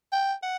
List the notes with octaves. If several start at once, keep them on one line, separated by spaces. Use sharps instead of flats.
G5
F#5